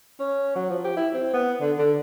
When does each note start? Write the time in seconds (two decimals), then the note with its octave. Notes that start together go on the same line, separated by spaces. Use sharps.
0.20 C#4
0.55 F#3
0.70 F3
0.84 G4
0.97 E4
1.14 C4
1.33 B3
1.61 D3
1.79 D3